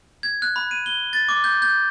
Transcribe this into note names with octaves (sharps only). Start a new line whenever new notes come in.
G#6
F#6
B5
D#7
G7
A6
D6
G6
G6